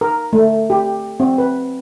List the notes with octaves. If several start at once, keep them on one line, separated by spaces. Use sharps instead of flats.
A#4
A3
G4
C4
B4